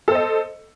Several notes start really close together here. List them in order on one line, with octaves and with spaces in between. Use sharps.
A4 C5 D#5